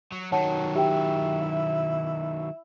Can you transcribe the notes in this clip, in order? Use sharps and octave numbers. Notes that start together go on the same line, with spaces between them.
F#3
D#3 F#3 C#5 F#5 A5
E4 G4 G5
E5